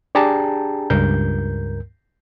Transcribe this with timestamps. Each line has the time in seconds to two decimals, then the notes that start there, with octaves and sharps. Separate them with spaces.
0.15 D4 G4 G#4 G5 A5 A#5
0.90 C#2 G2 A#4 G6